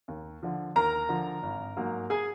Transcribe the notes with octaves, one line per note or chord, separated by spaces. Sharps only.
D#2
D3 F3
D#2 A#4 A#5
D3 F3
G#1
G#2 F#3 A#3
G#4 G#5